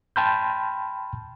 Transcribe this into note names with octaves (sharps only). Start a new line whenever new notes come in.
G5 A5 B5 C6 F6 G6